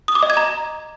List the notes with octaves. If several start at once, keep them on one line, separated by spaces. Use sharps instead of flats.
D#6
D6
D#5
G#6
A#5